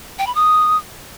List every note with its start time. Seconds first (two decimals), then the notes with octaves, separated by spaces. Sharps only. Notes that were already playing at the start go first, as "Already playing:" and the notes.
0.19 G5
0.27 B5
0.35 D#6